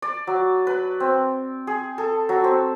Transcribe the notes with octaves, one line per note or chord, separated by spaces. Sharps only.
D5
F#3
B4
C4
G#4
A4
F#3
C4